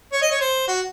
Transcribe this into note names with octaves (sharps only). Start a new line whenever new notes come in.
C#5
D#5
C#5
C5
F#4